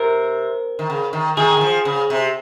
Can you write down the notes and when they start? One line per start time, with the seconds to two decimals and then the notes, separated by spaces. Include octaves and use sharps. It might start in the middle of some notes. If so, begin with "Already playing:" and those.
Already playing: C3 A#4
0.79 D#3
0.90 C#3
1.13 D#3
1.37 D#3 G#4
1.57 D#3
1.61 F3
1.85 C#3
2.10 C3